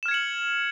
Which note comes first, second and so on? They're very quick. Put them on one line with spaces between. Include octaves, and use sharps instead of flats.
E7 F6 G#6 C#7 F#7